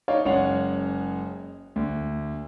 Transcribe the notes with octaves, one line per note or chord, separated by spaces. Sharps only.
D#4 C#5 D5 F5
F#1 G#3 C#4 C#5 F#5 F7
D2